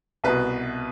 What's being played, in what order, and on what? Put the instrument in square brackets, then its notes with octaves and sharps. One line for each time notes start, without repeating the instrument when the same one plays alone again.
[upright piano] C2 B2 B4